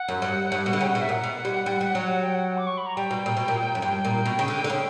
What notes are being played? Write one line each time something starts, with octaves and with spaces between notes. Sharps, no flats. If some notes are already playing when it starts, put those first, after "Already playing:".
Already playing: F#5
F#2
G2
G2
B2
D3
C#3 G5
B2 F#5
E5
A#2 F#5
B2
G3
G3
G3
F#3
F#5
G5
F#5
D6
C#6
B5
A#5
G3 G5
B2
A#2
B2
A#2
F#2
G2 G5
A#2
B2
C#3
D3
D3
C#3 G5